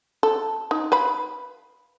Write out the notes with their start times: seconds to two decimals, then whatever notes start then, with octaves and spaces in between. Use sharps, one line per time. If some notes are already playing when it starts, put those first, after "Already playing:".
0.23 A4
0.71 D#4
0.92 B4 F5 B5